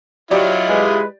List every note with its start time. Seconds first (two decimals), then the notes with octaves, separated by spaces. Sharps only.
0.31 F#3 E4 F4 G4 D5 D#5
0.69 G#3 B4